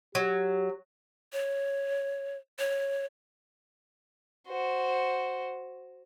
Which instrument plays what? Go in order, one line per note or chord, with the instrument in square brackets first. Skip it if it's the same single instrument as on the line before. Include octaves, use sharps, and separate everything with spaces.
[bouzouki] F#3 [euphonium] G4
[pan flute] C#5
C#5
[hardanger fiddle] F#4 C5